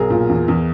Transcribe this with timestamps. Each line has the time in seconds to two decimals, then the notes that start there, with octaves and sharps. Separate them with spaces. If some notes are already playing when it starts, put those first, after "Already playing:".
Already playing: B1 G#4 A#4
0.10 A#2
0.29 E2
0.48 E2